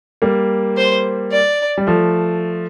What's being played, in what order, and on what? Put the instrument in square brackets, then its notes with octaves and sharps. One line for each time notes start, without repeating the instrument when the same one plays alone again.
[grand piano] G3 A#3
[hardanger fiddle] C5
D5
[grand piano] G3
F3 A3